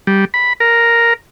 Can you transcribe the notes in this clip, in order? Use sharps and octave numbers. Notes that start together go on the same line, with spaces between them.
G3
B5
A#4